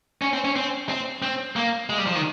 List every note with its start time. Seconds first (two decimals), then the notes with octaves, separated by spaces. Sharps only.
0.22 C#4
0.33 C4
0.45 C#4
0.56 C4
0.89 C4
1.22 C4
1.56 A#3
1.90 G#3
1.98 G3
2.07 F3
2.15 D#3